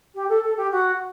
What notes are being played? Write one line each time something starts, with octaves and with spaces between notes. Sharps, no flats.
G4
A4
A4
G4
F#4